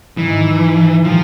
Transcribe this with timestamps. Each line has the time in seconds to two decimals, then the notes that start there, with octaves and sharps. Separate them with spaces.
0.17 G#2 D#3 E3 F#3 A#3 D#4
1.04 A#2 F3 G3 A#3 D4 G4